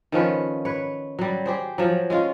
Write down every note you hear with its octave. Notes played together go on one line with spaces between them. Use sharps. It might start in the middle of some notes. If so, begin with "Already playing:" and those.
D#3 F3 C#4 B4
B4 C#5
F#3 G3
G4 G#4 C5
F3 F#3
G#3 C#4 F4